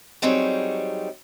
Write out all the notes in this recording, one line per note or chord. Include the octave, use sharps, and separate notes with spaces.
F#3 G3 C4 D#4 G#4 C#5